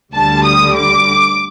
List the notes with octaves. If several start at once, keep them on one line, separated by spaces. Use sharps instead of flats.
D2 D3 G3 A5
D#6
D6